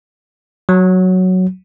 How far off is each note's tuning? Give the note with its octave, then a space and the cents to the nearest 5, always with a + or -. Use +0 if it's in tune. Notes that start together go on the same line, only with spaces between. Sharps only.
F#3 +0